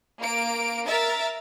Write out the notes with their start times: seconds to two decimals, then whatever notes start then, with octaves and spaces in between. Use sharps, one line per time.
0.20 A#3 D7
0.86 A#4 E5 A6